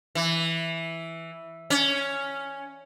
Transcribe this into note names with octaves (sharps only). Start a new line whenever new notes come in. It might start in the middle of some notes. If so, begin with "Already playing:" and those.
E3
C#4